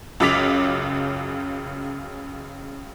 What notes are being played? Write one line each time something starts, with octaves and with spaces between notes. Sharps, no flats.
C#2 F#2 C#3 D6 B6 F7